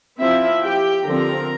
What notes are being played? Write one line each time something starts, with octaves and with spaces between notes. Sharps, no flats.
F3 C4 E4 E5
G4 G5
D3 F3 C4 A#4 A#5